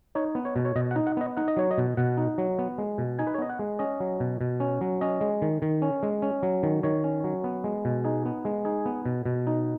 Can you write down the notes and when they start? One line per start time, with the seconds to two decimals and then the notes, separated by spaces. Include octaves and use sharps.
0.15 D#4 C#5
0.35 B3
0.45 C#5
0.56 B2
0.65 C#5
0.76 B2 D#5
0.91 F#5
0.96 D#4
1.07 F#5
1.17 B3 D#5
1.37 D#4 F#5
1.48 D#5
1.57 F#3 C#5
1.71 D#5
1.78 B2
1.97 B2 F#5
2.17 D#4
2.38 F#3
2.59 B3
2.78 G#3
2.98 B2
3.19 D#4 G#5
3.27 B4
3.34 C#5
3.39 B3 D#5
3.49 F#5
3.59 G#3
3.79 C#4 D#5
4.00 F#3
4.20 B2
4.41 B2
4.60 C#4
4.81 F#3
5.01 C#4 D#5
5.21 G#3
5.42 D#3
5.62 D#3
5.82 C#4
6.03 G#3
6.22 C#4
6.43 F#3
6.63 D#3
6.83 D#3 C#5
7.04 C#4
7.24 F#3
7.44 B3
7.64 G#3
7.85 B2
8.04 D#4 G#4
8.25 B3
8.45 G#3
8.65 D#4 G#4
8.86 B3
9.06 B2
9.25 B2
9.47 D#4